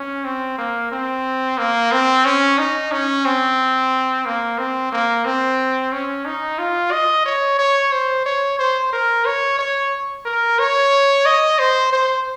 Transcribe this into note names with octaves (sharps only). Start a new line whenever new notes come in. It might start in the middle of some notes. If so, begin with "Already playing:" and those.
Already playing: C#4
C4
A#3
C4
A#3
C4
C#4
D#4
C#4
C4
A#3
C4
A#3
C4
C#4
D#4
F4
D#5
C#5
C#5
C5
C#5
C5
A#4
C#5
C#5
A#4
C#5
D#5
C5
C5